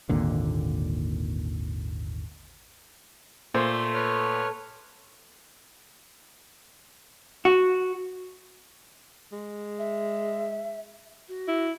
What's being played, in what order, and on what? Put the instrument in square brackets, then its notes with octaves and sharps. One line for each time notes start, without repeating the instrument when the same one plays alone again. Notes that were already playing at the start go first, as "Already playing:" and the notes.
[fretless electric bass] G#1 D#2 A#2 D3
[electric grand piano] A#2 [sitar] A3 [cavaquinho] C5
[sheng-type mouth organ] B4 C#5 F6
[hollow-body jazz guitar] F#4
[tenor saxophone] G#3
[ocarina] E5
F#4
[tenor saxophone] E4